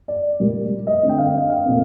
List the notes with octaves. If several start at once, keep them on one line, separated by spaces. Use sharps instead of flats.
D5
A#2 G3 A#3
D#5
D3 A3 C4
G5
F5
D#5
F5
A#2 A3 C4